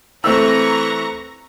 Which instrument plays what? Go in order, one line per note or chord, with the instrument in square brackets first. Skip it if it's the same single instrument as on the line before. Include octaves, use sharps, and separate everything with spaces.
[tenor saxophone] E3 [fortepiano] A3 C4 E6 [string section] A#5 C#6 A#6